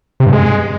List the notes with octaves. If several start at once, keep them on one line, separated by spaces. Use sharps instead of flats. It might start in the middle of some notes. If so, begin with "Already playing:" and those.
C3
G2
G#3